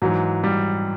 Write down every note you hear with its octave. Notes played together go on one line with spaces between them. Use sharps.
G#2 E3 F#3
G3